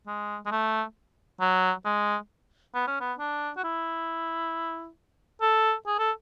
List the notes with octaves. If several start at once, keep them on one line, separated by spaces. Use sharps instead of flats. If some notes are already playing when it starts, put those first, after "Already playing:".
G#3
G#3
A3
F#3
G#3
B3
C#4
B3
D4
F#4
E4
A4
G#4
A4